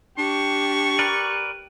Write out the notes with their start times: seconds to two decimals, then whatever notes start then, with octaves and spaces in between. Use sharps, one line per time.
0.18 D4 G4 C#6
0.99 A#4 B4 D5